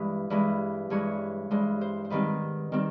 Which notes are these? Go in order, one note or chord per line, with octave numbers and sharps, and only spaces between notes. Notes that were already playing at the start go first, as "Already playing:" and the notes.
Already playing: G2 E3 G#3 B4
G2 E3 G#3 B4
G2 E3 G#3 C#5
G2 E3 G#3 C5
C5
C5
G#2 D#3 G3 C4 B4
D#3 G3 C4